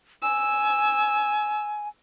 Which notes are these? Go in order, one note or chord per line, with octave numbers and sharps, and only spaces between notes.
G#5 E6